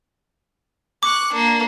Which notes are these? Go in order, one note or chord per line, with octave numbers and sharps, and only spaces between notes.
C#6 D6 F#6
A#3 D4